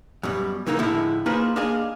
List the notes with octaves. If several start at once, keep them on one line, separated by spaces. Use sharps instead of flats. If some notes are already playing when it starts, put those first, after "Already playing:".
F#2 B2 G3
C#3 E3 G#3 A#3 C4 D#4
A2 D3 F3 G#3 E4
A#3 D#4 F4 G#4 B4 C5
A#3 D4 G#4 D#5 F5 G#5